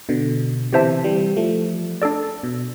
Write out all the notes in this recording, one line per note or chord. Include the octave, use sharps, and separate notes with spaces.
B2 D3
C3 E3 G4 C5 E5 A5
E3 G3
F3 A3
D4 A4 D5
B2